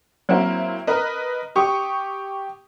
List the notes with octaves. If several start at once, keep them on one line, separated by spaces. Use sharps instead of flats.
F#3 A#3 C4 E4
A#4 B4 D#5
G4 C#6 D#6